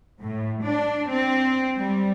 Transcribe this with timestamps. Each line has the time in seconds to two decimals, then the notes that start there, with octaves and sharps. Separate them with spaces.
0.21 A2
0.63 D4
1.10 C4
1.77 G3